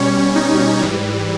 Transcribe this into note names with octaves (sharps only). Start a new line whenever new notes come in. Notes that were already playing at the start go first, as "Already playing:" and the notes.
Already playing: B2 G3 C#4 C#5
D#4
G#2 E3 G3